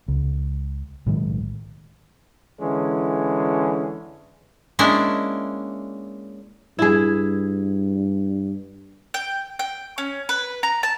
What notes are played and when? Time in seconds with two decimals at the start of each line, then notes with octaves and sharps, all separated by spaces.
0.08 C#2
1.06 B1 A2 D#3 G#3
2.60 D3 E3 G#3 C#4
4.79 G#3 A#3 C#4 D4 E4
6.79 G2 E4 G#4
9.14 G5
9.59 G5
9.98 C#4
10.29 B4
10.63 A#5
10.83 A5